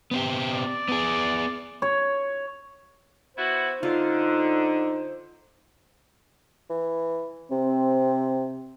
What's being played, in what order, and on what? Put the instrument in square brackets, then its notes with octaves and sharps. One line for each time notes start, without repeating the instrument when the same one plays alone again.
[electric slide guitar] B3 C4 G4
[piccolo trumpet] D5
[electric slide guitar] B3 G#4
[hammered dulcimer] C#5
[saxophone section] B3 E4 F#4 [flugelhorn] C5
[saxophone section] D3 [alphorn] D#4 [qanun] F4
[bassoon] E3
[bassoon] C3 [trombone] C4